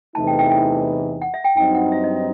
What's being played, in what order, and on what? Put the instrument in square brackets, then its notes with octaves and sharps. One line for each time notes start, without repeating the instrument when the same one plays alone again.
[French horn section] E2 C3 E3 A3 D#4 [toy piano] A5
[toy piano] G5
G5
G5
F#5
E5
G5
[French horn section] G2 F#3 C4 D#4 [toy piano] G5
[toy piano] F#5
E5
D#5
E5